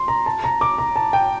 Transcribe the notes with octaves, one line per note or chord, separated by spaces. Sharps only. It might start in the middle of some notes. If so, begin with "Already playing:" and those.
Already playing: C6
A#5
A5
A#5
D6
A#5
A5
G5